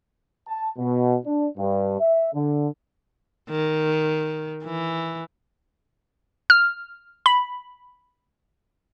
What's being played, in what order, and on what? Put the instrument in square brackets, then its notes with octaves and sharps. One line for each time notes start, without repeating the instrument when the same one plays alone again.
[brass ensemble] A5
B2
D4
G2
E5
D3
[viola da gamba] D#3
E3
[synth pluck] F6
B5